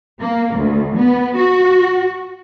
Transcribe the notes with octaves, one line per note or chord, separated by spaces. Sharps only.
A#3
D2
B3
F#4